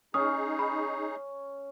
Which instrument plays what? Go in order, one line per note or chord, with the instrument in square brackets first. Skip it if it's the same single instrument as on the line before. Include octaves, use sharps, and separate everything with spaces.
[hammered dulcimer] C#4 [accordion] D#4 G#4 [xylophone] D#6
[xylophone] B5